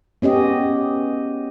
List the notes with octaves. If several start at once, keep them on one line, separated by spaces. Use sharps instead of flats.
B3 C#4 G4 D#5